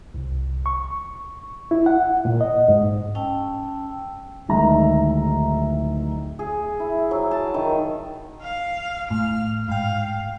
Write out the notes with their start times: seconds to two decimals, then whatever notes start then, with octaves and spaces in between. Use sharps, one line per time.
0.14 C2
0.66 C#6
1.71 E4
1.86 F#5
2.25 A#2
2.41 D#5
2.68 G#2
3.15 C#4 G5 A5 E6
4.48 D1 D#3 G#3 E5 A#5
6.39 G#4
6.80 E4
7.11 F#3
7.31 A5
7.54 D#3
8.42 F5
9.10 A2 F6
9.68 G#2 F5 G5